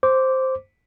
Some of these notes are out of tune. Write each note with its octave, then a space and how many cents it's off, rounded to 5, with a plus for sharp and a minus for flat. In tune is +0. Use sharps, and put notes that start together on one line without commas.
C5 +0 D6 -10